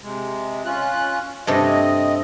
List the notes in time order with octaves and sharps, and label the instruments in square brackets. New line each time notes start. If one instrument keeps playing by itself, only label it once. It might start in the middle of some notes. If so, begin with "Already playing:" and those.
[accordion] C3 G#3
C#4 F4 F#6
[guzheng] G2 C3 A3 [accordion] C4 D#5